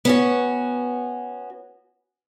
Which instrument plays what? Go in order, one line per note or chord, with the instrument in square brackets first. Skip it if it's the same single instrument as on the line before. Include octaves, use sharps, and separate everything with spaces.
[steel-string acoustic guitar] B3 C#4 F#4